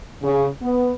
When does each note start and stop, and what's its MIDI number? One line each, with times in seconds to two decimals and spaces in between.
0.23 0.46 49
0.62 0.92 59